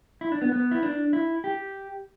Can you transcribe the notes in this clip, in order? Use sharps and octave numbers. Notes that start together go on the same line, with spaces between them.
E4
D4
B3
B3
E4
D4
E4
G4